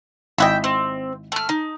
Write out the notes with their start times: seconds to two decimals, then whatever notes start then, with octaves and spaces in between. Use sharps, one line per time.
0.38 G#1 E4 D#5 E5 F#5 G5
0.64 C4
1.32 A3 F6
1.49 D#4